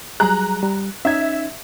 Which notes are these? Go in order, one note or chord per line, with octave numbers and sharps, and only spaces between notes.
F#3 G3 G#4 A#5 F#6
G3
C#4 D#4 E5 G#6